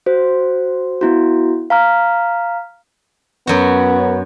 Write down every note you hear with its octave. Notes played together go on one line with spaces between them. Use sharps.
F#4 C5
B3 E4 F#4
F5 A#5 F6
F#2 B3 F#4